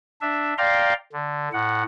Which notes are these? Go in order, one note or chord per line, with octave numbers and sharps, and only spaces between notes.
D4 E5
D5 F5 G5 A#5 C6
D3
A2 F#5